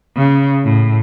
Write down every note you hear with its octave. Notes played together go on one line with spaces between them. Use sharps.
C#3
A2